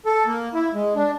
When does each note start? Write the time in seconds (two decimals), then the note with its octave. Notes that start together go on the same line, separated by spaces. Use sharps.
0.06 A4
0.27 A#3
0.54 E4
0.74 G#3
0.95 D4